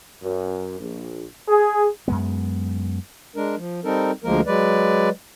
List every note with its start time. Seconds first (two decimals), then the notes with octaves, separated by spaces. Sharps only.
0.23 F#2
0.79 A#1
1.48 G#4
2.08 F#2 G#3 B3
3.36 G#3 D4 A#4
3.57 F3
3.84 G3 C4 D#4 A4 A#4
4.24 D2 F3 G#3 A#3 A#4
4.47 F#3 G#3 B4 D5